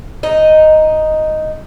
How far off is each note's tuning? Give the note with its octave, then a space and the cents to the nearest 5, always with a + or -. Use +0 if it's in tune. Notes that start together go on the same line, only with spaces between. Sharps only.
D#4 +0 D#5 +0